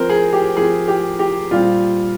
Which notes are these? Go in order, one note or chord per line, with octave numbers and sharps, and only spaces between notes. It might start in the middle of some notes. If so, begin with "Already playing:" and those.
Already playing: F3 C4 A#4 C5
G#4
G4
F3 C4 G#4
G4
G4
A#2 G3 C4 F4